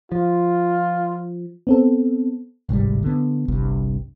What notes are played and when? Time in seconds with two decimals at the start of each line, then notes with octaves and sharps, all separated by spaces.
0.12 F3 F4
1.67 B3 C4 A4
2.69 G1 C2 G#2 G3
3.03 D3 B3
3.48 G1 C2 G2